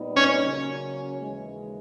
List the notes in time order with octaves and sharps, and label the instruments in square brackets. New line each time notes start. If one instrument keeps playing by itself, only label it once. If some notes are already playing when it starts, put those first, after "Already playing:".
Already playing: [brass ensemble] A#2 G3 B3 D#4
[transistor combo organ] C#4
[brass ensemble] C#3 F#3 A#3 C#4
D#2 C#3 E3 G#3